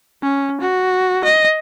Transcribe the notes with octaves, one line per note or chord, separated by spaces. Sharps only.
C#4
F#4
D#5